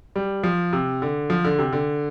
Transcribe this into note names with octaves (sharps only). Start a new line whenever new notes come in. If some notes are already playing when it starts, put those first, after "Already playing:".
G3
F3
C3
D3
F3
D3
C3
D3